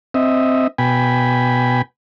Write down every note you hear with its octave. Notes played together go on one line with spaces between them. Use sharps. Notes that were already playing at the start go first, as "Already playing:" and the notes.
C4 D#5 E5
B2 G5 G#5 B5